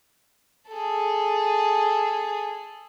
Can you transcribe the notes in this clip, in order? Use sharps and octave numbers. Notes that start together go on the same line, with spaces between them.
G#4 A4